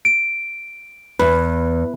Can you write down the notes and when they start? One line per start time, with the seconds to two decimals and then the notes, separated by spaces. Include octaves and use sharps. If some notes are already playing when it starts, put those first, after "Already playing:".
0.05 D7
1.19 E2 B4